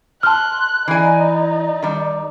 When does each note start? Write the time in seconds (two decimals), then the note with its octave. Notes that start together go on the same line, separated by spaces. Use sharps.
0.23 A5 C6 F6 F#6
0.88 E3 D#4 D5 G#5
1.83 D#3 G3